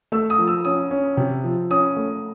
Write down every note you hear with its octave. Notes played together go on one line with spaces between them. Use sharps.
A3 E6
D#6
F3
E6
C#4 D#6
C#4
C3
F3
C#4 D#6
A3